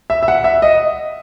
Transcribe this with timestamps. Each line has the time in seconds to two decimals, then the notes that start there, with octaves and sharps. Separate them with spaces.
0.10 E5
0.23 E5
0.28 F#5
0.44 E5
0.62 D#5